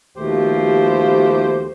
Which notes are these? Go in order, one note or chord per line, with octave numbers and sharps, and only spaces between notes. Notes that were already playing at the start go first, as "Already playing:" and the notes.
D#2 B2 F3 A3 G4 C5